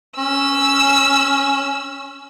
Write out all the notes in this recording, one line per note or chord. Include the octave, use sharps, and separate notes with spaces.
C#4 E6